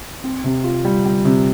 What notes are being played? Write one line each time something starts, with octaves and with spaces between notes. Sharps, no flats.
C4
C3
F4
G3
G3
C3